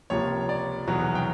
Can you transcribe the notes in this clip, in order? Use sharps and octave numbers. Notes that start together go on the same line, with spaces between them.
C#2 C3 F3 A#3 C#5
D5
F1 E2 B2 F#3
G5